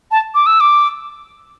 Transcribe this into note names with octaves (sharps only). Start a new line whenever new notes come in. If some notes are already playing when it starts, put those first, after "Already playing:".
A5
D6
E6
D6